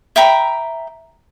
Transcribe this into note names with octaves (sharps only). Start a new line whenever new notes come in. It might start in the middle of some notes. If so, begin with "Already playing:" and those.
E5 G5 A#5 B5